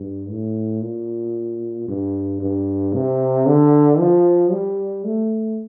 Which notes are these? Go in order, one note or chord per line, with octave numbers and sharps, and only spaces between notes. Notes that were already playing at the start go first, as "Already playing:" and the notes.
Already playing: G2
A2
A#2
G2
G2
C3
D3
F3
G3
A3